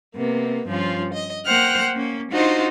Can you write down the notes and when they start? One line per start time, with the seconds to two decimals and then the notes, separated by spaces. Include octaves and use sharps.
0.15 C3 A#3 B3
0.67 G2 F3 C#4 F4
1.13 D#5
1.45 A#3 C5 F#5 G5 F6 F#6
1.95 A#3 C#4
2.32 D4 D#4 F4 F#4 C5